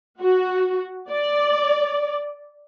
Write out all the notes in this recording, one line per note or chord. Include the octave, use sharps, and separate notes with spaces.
F#4
D5